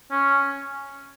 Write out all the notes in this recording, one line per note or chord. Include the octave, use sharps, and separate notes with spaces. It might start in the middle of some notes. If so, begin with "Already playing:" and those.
C#4